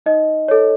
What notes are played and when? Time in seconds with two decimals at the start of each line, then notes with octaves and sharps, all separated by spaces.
0.06 D#4 D#5
0.48 A4 C#5